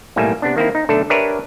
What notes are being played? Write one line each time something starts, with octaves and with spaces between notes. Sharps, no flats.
B1 A2 G3 A#3 E5 G#5
C3 B3 D4
D#3 A#3 C4 E4
D#4
B1 D3 A3 D4 A4
D4 G4 A#4 B4 C#5 E5